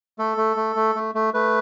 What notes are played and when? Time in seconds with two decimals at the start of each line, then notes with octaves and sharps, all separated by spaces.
0.19 A3 A4
0.38 A3
0.57 A3
0.76 A3
0.95 A3
1.15 A3
1.34 A3 B4